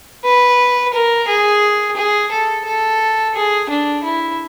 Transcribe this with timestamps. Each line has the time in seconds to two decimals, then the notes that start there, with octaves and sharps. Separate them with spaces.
0.25 B4
0.94 A#4
1.28 G#4
1.97 G#4
2.31 A4
2.65 A4
3.35 G#4
3.70 D4
4.04 E4